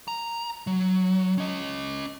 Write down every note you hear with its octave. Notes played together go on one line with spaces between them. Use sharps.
A#5
F#3
C#4 D#5